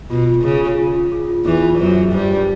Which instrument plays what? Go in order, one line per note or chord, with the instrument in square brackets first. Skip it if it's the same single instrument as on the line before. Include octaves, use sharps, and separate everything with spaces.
[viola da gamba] B2 [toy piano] F4
[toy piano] F4
[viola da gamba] C#3 [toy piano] G#4
[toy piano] F4
F4
F4
G#4
F4
[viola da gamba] E2 E3 [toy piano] G#4
[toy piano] F4
[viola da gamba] F#2 F#3 [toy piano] C5
[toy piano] G#4
[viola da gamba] G2 G3 [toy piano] C5
[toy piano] D4